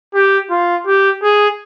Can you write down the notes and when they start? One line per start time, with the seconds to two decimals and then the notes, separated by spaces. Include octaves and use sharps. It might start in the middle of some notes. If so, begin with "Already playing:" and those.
0.15 G4
0.51 F4
0.87 G4
1.23 G#4